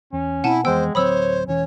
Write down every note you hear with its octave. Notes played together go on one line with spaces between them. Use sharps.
E2 C#4
B2 C4 E4 F#5 G#5 A5
F2 E3 G#3 B3 C5 G5 E6
D1 F#3 C4 C5 C#5 B5 D#6 E6
E1 E3 C#4 C#5